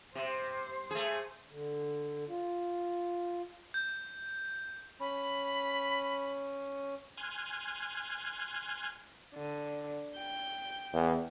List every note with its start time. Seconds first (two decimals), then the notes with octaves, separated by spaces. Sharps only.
0.15 C3 C5
0.91 A3 G#4
1.51 D3
2.29 F4
3.74 G6
5.00 C#4 B5
7.18 G#5 C6 F6 F#6 G#6
9.35 D3
10.16 G5
10.93 E2